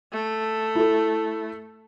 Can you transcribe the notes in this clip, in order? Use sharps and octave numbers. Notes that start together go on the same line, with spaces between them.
A3
E4 A4